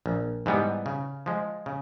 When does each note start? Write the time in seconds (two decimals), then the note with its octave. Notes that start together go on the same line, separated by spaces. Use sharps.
0.06 A#1
0.46 G#2 E3 G3 B3
0.86 C#3
1.26 F3 G#3
1.66 C#3